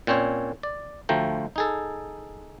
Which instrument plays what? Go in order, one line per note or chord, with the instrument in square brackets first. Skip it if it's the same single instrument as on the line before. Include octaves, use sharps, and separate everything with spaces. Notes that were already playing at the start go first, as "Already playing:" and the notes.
[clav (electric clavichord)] A#2 C4 C#4 C5 C#5
D5
D2 F3 A3 G5 A#5
D#4 G#4 A4